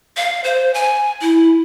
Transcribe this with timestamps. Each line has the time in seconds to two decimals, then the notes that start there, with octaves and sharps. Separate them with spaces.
0.17 F5
0.44 C5
0.74 G#5
1.21 E4